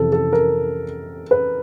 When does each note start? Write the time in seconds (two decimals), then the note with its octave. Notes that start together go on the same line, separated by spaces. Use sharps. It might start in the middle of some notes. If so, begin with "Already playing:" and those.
Already playing: F2 C3 E3 A4
0.12 A4
0.32 A#4
1.31 B4